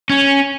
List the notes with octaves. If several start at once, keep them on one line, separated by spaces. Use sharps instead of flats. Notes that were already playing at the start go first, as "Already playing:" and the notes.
C#4